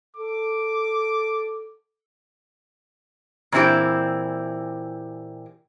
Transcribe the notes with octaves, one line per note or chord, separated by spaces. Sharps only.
A4 D6
A#2 E3 C4 C#4 E4 G4